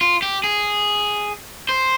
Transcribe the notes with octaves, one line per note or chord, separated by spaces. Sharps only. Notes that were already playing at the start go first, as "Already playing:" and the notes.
F4
G4
G#4
C5